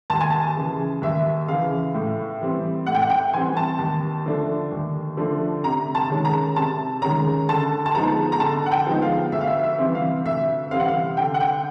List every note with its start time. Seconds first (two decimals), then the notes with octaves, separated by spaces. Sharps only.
0.10 D#2 A5
0.21 G#5
0.30 A5
0.56 C#3 E3
1.02 D#2 E5
1.48 C#3 E3 F5
1.94 A2
2.41 E3 G3 C4
2.86 A2 F#5
2.94 G5
3.02 F#5
3.10 G5
3.33 E3 G3 C4 G#5
3.57 A5
3.79 D#2
4.26 D3 F3 A3 D4
4.72 D#2
5.17 D3 F3 A3 D4
5.64 C3 A#5
5.95 A5
6.10 D#3 G#3 C#4
6.25 A#5
6.56 C3 A5
7.02 D#3 G#3 C#4 A#5
7.49 D3 A5
7.86 A5
7.94 F3 G#3 B3 D#4 A#5
8.32 A#5
8.40 D3 A5
8.66 F#5
8.72 G5
8.87 F3 G#3 B3 D#4
9.02 F5
9.32 D2 E5
9.41 F5
9.47 E5
9.64 E5
9.78 C3 E3 G3 C4
9.95 F5
10.25 D2 E5
10.71 C3 E3 G3 C4 F5
10.79 F#5
10.88 F5
11.17 D3 G5
11.34 F#5
11.40 G5